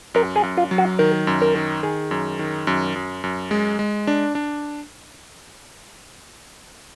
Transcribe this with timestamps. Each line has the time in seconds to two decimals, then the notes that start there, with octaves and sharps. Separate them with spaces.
0.14 F#2 A#4
0.36 G#4
0.43 F#2
0.57 F4
0.71 F#3
0.78 F#4
0.99 D#3 A#4
1.27 F#2
1.42 A#4
1.55 D#3
1.83 D#3 G#4
2.11 F#2
2.39 D#3
2.67 F#2
2.96 F#2
3.24 F#2
3.51 G#3
3.79 G#3
4.07 D4
4.35 D4